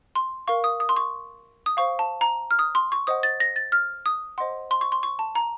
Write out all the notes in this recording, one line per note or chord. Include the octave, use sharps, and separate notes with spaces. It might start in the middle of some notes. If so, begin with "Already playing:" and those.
C6
A#4 F5 C#6
D#6
D#6
C6
C#6
D#6
C5 F5 C#6
A5
A#5
F6
D#6
C6
C#6
C5 D#5 F#5 D#6
A6
A#6
A6
F6
D#6
C5 D#5 F#5 C6
C6
C#6
C6
C#6
A5
A#5